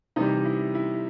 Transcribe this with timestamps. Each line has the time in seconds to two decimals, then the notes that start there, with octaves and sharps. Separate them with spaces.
0.16 C3 E3 G3 D#4
0.45 E4
0.75 E4